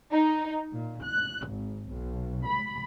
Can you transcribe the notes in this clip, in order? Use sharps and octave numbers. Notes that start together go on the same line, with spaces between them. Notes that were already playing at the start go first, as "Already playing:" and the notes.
D#4
A#2
F#6
G#1
B1
B5